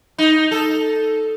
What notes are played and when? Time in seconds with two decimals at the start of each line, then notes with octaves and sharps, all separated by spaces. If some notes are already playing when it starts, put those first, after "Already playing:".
0.18 D#4
0.51 A4